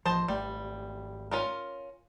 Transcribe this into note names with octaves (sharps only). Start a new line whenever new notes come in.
A1 F3 C5 D#5 A5
G#1 G3 A3
C#4 F4 A#4